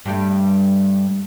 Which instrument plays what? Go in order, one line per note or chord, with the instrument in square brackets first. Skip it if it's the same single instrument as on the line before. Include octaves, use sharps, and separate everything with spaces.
[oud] G2 G3 A3